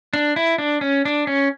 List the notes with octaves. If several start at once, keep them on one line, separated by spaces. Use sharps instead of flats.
D4
E4
D4
C#4
D4
C#4